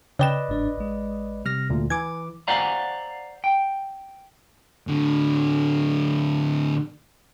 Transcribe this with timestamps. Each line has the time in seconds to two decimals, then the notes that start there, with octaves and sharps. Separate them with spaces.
0.19 C#3 B4 D5 D#5 G5 E7
0.49 G1 G#2 D4
0.78 A1 G#3
1.45 C3 G3 F6 A#6
1.70 D2 A#2
1.90 E3 G#5 D6 G#6
2.48 C5 D5 F5 F#5 G#5 A#5
3.44 G5
4.87 A2 D3